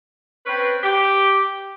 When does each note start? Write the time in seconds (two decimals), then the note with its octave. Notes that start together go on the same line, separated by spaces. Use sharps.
0.46 C4 C#4 B4
0.84 G4